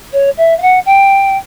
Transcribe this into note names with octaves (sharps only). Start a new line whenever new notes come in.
C#5
E5
F5
F#5
G5